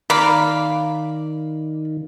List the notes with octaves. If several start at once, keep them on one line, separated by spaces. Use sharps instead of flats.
D#3 A#3 D5 F5 B5